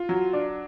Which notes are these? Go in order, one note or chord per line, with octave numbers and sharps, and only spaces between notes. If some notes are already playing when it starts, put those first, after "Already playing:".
Already playing: F4
F#3
D4